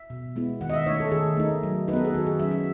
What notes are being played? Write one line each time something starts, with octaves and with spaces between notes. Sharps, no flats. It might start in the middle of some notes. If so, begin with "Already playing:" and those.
Already playing: E5
B2
G#3 B3 E4
D#3 F#5
D#5
E5
A3 D#4 C#5
A4
D#3 G#4
A3 D#4
F#3
D#4 B4
B3 A4
G#4
D#3 F#4
G#4
F#3 C#4 E5
E5